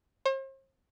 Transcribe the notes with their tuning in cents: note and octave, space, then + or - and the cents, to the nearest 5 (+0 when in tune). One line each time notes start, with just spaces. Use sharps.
C5 +40